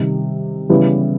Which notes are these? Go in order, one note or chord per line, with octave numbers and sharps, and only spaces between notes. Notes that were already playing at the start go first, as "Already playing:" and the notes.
Already playing: C3 D#3 G3
C#3 E3 G3 B3 E4